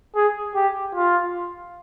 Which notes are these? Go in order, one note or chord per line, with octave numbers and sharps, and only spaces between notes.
G#4
G4
F4